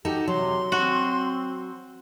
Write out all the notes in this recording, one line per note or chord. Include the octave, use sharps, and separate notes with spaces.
D#4 F#4 G4 A4
C3 F#3 C6
C4 F#4